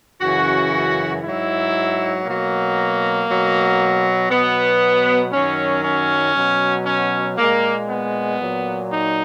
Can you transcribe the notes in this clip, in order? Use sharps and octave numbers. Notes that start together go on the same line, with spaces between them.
F#2 C#3 E3 F#4
G#2 F#3 E4
B2 F#3 A#3
B2 F#3
B2 F#3 B3
F#2 D#3 F#3 C#4
C#4
B2 F#3
C#4
A#2 G#3 A#3
B3
A#2 F#3
D#4